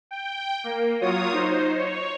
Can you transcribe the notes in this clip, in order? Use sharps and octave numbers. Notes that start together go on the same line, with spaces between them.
G5
A#3
F#3 F4 C#5 D#6
D#4 C5
C#5